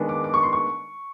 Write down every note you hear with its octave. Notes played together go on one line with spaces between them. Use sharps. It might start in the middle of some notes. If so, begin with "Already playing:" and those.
Already playing: D#2 D#3 G#3 B3 D4
D6
D6
C#6
C6
C#6